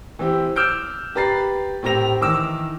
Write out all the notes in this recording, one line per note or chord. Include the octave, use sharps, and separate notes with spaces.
E3 C4 G4
D6 E6 F6 G6 D7
G4 B4 A#5 A6 C7
A2 C4 G4 A#4 A#6 F7
D#3 E3 D6 E6